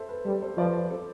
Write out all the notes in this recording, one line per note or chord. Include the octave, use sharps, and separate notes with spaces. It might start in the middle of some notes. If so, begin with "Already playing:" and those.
Already playing: A4 C5 E5
B4
G3 A4
A4 C5
F3 B4 D5
A4 C5